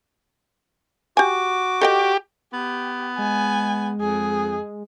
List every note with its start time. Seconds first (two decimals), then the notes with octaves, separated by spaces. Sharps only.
1.17 F#4 G4 G#5 D6
1.81 G4 A4 D#5 G5
2.53 B3 G4
3.18 G#3 G#5
4.01 F2 G#4